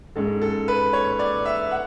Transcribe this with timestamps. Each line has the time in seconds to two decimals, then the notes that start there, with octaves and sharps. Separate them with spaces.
0.16 G#2 G#3 C#4 A4
0.42 A4
0.68 B4
0.93 C#5
1.19 D5
1.45 E5
1.71 F#5